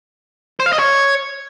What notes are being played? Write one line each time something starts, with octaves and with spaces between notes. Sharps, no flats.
C5
F5
D#5
C#5